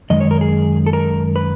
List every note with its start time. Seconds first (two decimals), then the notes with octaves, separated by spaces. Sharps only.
0.10 F#2 D#3 G#3 D#5
0.20 C#5
0.31 A#4
0.41 G#4
0.86 A4
0.93 A#4
1.36 B4